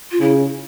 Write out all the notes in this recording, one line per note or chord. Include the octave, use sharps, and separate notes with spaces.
F4
C#3 E4